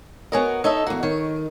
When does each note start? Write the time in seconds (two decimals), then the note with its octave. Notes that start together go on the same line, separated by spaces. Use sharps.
0.32 B3 F#4 G#4 A#4 C#5 D#5
0.64 D#4 A4 C#5 D#5 E5
0.87 E2 A#3 F#4
1.03 D#3 C#5